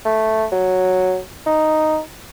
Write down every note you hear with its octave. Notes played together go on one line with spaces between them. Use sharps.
A3
F#3
D#4